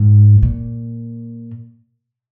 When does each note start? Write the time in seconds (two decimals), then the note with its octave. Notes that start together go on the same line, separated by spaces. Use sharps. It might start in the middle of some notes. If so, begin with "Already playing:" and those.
Already playing: G#2
0.43 A#2